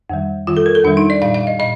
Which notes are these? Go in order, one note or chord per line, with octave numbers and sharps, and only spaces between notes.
F2 D#3 G3
F2 D#3 G3 F4
A4
A#4
A4
F2 D#3 G3 D4
D#4
D5
A#2 G3 F5
F5
D#5
A#2 D#5